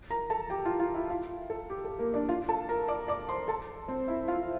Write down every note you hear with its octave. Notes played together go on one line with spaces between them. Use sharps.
A#4 A#5
A4 A5
G4 G5
F4 F5
F4 F5
E4 E5
F4 F5
A4
G4
A4
A#3 A#4
D4 D5
F4 F5
A4 A5
A#4 A#5
D5 D6
D5 D6
C5 C6
A4 A5
C4 C5
E4 E5
F4 F5